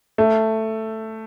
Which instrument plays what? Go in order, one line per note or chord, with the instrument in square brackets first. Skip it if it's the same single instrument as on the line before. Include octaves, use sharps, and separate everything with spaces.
[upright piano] A3